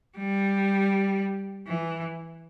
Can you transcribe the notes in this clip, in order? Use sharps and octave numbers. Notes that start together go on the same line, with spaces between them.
G3
E3